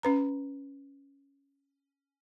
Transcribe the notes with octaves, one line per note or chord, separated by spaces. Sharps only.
C#4 B4 A#5